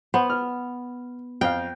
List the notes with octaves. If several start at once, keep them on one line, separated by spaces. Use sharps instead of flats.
B3 C5
F6
F2 F5 G5